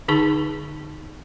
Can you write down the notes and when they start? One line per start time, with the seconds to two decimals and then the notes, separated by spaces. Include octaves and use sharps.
0.08 D3 D#4 G#4 A5 C#6